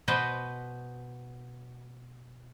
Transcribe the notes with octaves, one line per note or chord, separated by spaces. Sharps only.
B2 B4 C5 D#5